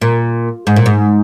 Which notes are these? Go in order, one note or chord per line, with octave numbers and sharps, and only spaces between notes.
A#2
G#2
A#2
G#2